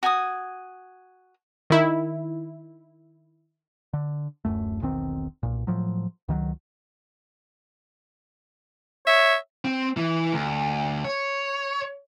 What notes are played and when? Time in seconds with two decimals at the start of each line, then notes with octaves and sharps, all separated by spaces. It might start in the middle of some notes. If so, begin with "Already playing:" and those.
0.03 F#4 G#5 A5 D#6
1.70 D#3 E4
3.93 D3
4.45 D1 F#2 A3
4.81 E1 B1 D#3 C4
5.43 B1 A#2
5.67 A2 F3 F#3
6.28 C#2 D#3 E3 F#3
9.07 C#5 E5
9.65 C4
9.97 E3
10.33 D2
11.05 C#5